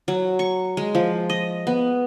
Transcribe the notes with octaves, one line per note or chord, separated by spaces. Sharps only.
F#3
C#6
G#3
F3
D#5
B3